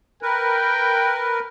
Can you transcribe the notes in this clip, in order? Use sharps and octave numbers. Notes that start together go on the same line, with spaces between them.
A#4 B4 G5